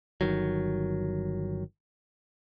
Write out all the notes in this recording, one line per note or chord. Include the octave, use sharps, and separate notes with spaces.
G1 D#3 F#3